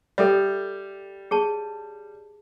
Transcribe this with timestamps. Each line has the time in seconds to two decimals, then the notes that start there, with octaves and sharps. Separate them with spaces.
0.18 G3 A4 E5
1.31 G#4 C#5 A5